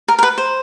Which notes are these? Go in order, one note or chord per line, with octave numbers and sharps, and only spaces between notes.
A#4
A#4
B4
C5